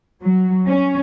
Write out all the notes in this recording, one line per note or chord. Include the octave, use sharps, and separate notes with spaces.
F#3
C#4